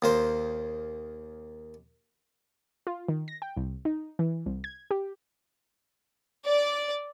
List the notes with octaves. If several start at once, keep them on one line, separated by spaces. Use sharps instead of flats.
D#2 A#3 C5
F4
D#3
A#6
G5
C2
D#4
E3
C2
G#6
G4
D5